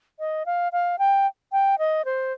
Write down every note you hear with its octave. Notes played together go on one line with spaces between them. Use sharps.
D#5
F5
F5
G5
G5
D#5
C5